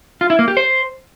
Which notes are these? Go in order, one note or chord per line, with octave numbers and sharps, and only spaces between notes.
F4
E4
A#3
G4
C5